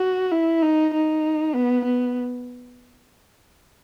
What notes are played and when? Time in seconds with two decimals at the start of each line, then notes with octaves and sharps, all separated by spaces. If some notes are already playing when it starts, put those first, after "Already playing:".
Already playing: F#4
0.32 E4
0.63 D#4
0.94 D#4
1.55 B3
1.85 B3